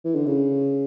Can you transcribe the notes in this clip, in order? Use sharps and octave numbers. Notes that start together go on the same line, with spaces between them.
E3
D3
C#3